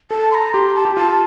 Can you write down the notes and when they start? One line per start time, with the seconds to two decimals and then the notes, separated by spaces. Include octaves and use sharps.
0.11 A4 A5
0.31 C6
0.35 A#5
0.53 G4 C6
0.75 A5
0.85 G4
0.96 F4 A5